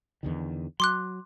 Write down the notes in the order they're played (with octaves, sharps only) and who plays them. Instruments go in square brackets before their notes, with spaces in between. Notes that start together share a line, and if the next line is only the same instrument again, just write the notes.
[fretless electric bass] E2 D3 D#3
[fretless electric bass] F#3 [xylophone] C6 D6 F#6